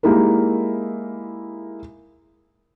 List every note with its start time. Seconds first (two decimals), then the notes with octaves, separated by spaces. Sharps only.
0.03 G#3 A#3 D#4 E4 G4 A#4